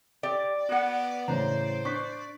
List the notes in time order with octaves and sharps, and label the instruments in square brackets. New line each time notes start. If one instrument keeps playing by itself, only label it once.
[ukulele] G4 [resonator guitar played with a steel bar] D5
[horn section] B3 [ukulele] F#4 F#5
[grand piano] A2 C#3 E3 [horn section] C5 [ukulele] A#5
[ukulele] D4 [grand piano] C#6 B6